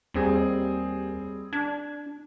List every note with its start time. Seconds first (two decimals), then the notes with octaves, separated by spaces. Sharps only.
0.14 D#2 G3 C4 G#4
1.53 D4 G#6